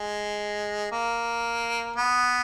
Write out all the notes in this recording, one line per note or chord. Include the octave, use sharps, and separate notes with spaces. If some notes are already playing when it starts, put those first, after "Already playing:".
Already playing: G#3
A#3
B3